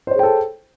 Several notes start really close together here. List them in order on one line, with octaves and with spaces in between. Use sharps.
C5 C#5 G#4 G5 A4